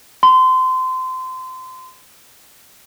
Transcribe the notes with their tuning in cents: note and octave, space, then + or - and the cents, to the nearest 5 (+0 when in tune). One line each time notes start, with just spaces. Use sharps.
C6 -25